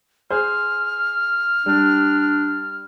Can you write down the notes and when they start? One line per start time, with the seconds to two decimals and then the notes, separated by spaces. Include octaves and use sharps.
0.30 G#4 C5 F6
1.66 G3 D4